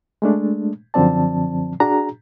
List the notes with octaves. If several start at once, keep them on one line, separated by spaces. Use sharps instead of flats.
G#3 A3 D4
F#2 D3 F3 C4 D5 A5
D4 F#4 G#4 A#5